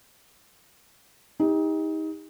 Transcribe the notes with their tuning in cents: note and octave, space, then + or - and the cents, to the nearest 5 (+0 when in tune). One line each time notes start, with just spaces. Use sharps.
D#4 +25 G4 +35